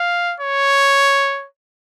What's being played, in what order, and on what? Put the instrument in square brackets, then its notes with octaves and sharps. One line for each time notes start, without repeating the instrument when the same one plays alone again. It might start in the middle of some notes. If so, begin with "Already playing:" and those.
Already playing: [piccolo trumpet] F5
C#5